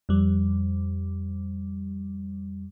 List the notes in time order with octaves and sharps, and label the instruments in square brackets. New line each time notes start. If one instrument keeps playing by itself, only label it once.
[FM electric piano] F2 G3